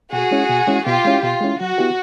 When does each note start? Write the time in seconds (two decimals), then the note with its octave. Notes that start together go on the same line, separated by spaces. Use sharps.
0.12 B2 F#4 G#4
0.31 G#3 C#4 E4
0.50 B2
0.67 G#3 C#4 E4
0.86 B2 F4 G4
1.05 G#3 C#4 E4
1.23 B2 F4
1.41 G#3 C#4 E4
1.60 F#3 F#4
1.78 B3 E4 G4